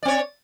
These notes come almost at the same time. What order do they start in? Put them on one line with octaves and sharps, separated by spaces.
D5 C4 C#5